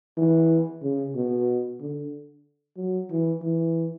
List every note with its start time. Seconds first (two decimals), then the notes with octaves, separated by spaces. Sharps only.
0.17 E3
0.82 C#3
1.15 B2
1.81 D3
2.77 F#3
3.10 E3
3.42 E3